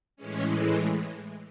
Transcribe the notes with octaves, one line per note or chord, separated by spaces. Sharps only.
A2 E3 G#3 C#4